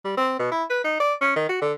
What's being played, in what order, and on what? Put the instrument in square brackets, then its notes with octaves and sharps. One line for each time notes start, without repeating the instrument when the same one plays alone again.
[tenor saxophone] G3
C4
B2
E4
B4
D#4
D5
C#4
D#3
F#4
D3